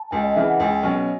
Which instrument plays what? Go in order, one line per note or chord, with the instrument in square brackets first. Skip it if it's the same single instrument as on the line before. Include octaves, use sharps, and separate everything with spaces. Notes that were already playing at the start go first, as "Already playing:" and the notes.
Already playing: [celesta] A5
[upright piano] C#2 [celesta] G#5
[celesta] D#5
[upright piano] C#3 E3 [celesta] E5
[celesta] F#5
[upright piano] C#2 [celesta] G#5
[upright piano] B2 F#3 C#4